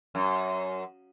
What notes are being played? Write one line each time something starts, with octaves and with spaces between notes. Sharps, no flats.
F#2